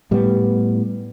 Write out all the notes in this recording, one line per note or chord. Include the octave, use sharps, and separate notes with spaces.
A2 G3 B3